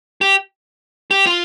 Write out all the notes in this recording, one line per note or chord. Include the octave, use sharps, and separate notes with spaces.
G4
G4
F4